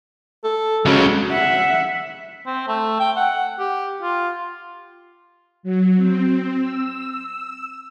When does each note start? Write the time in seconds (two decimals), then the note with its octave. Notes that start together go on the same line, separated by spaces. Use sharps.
0.44 A4
0.85 C#2 C#3 F#3
1.31 E5 F#5
2.46 C4
2.68 A3
3.00 G5
3.16 F#5
3.59 G4
4.02 F4
5.63 F#3
5.96 C4
6.59 E6